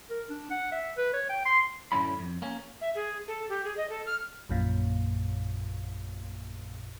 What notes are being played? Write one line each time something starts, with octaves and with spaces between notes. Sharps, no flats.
A#4
D4
F#5
E5
B4
C#5
G5
C6
F#2 A2 D3 C#4 E4 B5
F2
A#3 C#4
E5
G#4
A4
G4
G#4
D#5
A4
F6
A#1 F#2 A#2